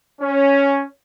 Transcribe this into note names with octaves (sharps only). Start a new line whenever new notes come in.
C#4